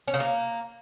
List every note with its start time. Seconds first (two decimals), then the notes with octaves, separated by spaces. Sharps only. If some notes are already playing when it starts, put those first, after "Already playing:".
0.08 C#4
0.14 C#3
0.20 A#3